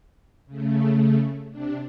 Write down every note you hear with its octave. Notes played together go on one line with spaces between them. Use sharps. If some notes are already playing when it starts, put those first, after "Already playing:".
C#3 A3
C3 D4